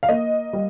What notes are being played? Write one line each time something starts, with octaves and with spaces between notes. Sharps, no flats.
F5
A#3 D#5
G3